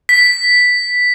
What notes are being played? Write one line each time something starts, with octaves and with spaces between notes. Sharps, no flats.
B6